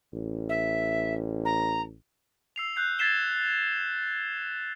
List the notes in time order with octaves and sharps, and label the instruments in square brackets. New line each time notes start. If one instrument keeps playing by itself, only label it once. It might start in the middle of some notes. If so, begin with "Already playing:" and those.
[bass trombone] A1
[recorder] E5
A#5
[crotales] E6 C7 F7
F#6 G6 C7
G#6 A6 B6 C7 E7 G7